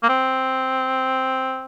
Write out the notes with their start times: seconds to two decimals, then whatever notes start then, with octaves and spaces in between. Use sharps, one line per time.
0.03 A#3
0.09 C4